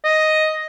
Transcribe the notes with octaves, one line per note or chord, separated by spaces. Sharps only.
D#5